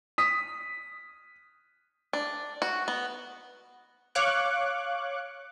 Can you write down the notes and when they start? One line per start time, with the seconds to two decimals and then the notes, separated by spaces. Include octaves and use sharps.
0.18 D#6 B6
2.13 D4
2.62 F#4
2.88 B3
4.15 C#5 F5 C#6 D6 F#6